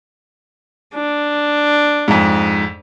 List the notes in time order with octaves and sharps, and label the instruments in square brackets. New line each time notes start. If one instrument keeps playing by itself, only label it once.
[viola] D4
[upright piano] F2 G#2